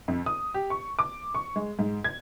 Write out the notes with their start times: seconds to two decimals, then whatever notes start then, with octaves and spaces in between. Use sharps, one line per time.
0.08 F2
0.26 D#6
0.54 G4
0.70 C#6
0.99 D6
1.35 C#6
1.56 G#3
1.79 G#2
2.04 G#6